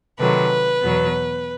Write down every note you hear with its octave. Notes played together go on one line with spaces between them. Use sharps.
C3 D#3 F#3 A3 B4
E2 B2 F#3 B3